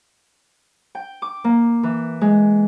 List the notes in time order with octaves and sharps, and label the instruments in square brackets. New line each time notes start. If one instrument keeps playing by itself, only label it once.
[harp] G5
D6
A#3
E3
G#3